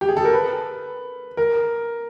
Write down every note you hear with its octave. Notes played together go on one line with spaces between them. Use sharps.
G4
G#4
A4
A#4
B4
A#4